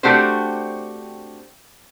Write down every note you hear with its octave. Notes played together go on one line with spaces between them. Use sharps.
A3 C4 D4 F#4 G4 C5